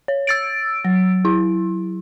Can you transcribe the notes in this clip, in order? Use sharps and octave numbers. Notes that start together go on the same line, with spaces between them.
C#5
E6 A6 D7
F#3
E4